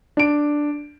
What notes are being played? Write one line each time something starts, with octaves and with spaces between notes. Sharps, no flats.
D4 D7